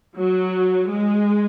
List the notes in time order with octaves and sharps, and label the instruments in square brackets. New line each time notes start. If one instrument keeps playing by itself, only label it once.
[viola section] F#3
G#3